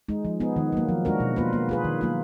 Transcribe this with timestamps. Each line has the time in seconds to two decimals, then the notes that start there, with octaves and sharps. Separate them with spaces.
0.09 G#3 D#4
0.25 F3
0.40 B3 D#4 G#4
0.56 D#3
0.72 F#3 A#3
0.89 F3
1.05 G#3 D4 F#4 A#4
1.20 B2
1.36 A#3 F4 B4
1.53 A#3
1.69 F4 G#4 B4
1.84 D#3
2.01 F#3 A#3 F4